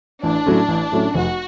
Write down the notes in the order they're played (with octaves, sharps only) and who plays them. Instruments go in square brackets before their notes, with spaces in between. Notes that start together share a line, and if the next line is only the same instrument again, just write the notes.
[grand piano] A1 [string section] D4
[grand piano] A2 F#3 A3 C#4
A1
A2 F#3 A3 C#4
[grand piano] F1 [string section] F#4